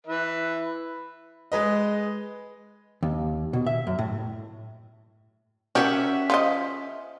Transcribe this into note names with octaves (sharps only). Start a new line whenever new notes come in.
E3 B4 E5
G#3 B4 D#5
D#2
B2
E5
F#2
A2
C#4 F#4 G4 A#4 E5 F#5
F3 C5 D#5